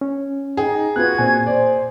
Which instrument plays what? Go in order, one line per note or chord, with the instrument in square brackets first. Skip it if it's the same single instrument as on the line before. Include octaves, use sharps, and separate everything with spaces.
[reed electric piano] C#4
[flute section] D#4 [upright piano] G#4 [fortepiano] G5
[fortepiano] B3 F4 B4 [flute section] F#4 G#6 [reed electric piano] F#6
[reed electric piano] A#2 G#5 [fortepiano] C4
[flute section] C5 [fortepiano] D5